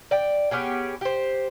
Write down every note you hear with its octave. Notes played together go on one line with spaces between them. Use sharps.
D5 G5
B3 C#4 G4 G#4
G4 C5